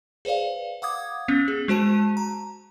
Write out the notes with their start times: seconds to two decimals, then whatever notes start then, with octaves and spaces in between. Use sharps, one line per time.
0.25 G#4 B4 C5 D5 F5
0.82 F5 F#5 D6 D#6 G#6
1.28 B3 C#4
1.48 G#4
1.68 G#3 F#4 C5 A5 D#7
2.17 A#5